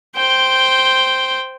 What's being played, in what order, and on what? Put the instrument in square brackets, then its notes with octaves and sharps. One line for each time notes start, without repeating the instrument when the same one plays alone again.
[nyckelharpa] C5 G5